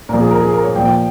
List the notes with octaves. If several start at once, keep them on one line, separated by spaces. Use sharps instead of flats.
A#2 F3 A#4
G#4
A#4
G#4
A#4
C#5
A#2 F3 G5
G5